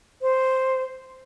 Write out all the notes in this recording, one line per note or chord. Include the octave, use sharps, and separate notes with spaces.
C5